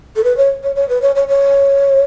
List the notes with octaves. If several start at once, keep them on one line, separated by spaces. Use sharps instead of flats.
A4
B4
C#5
C#5
C#5
B4
C#5
C#5
C#5